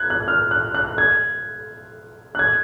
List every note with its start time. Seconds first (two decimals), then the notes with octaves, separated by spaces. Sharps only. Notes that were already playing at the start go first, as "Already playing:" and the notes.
Already playing: F#6 G#6
0.10 F#6
0.28 F6
0.51 F#6
0.74 F#6
0.98 G#6
2.35 F#6
2.39 G#6